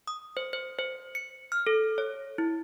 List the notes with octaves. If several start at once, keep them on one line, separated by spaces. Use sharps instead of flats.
D#6
C5
C5
C5
C#7
F6
A4
C#5
E4